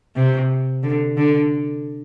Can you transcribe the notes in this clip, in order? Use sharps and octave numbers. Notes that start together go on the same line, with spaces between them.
C3
D3
D3